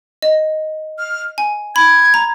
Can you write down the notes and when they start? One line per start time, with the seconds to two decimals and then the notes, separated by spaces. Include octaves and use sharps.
0.22 D#5
0.99 F6
1.38 G#5
1.76 B5 G#6
2.14 A#5